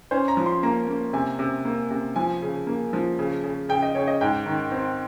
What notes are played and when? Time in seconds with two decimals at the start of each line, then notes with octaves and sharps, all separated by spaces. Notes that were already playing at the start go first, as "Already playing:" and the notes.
0.11 C#4 C5
0.28 A#5
0.37 F3
0.46 C6
0.63 A#3 A#5
0.88 A#3
1.13 C3 G#5
1.39 C3
1.65 A#3
1.91 C3
2.16 F3 G#5
2.42 C#3
2.67 A#3
2.93 F3
3.19 C#3
3.44 C#3
3.69 C#3 G5
3.82 D#5
3.95 C#3 C#5
4.08 D#5
4.21 G#2 G5
4.46 D#3
4.72 C4